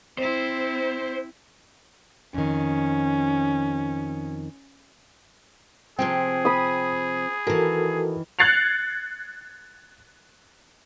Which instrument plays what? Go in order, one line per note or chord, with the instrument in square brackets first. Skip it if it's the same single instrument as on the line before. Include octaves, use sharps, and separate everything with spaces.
[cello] C4 E4 [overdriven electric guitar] C5
[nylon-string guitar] F2 D#3 [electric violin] C#4
[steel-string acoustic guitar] C3 F3 C4 [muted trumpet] G#4 [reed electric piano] G5
[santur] B5 D#6
[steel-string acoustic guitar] D#3 E3 [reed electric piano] F#4 A4 A#4
[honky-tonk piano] F#6 G#6 A6 C7 C#7 F7